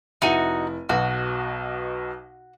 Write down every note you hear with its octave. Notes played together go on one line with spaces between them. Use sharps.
F1 D#4 E4 F#4 D#7
B1 B2 F#4